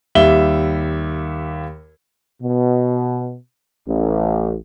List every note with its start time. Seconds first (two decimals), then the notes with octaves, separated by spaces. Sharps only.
0.15 D#2 G3 E5 G7
2.42 B2
3.87 A1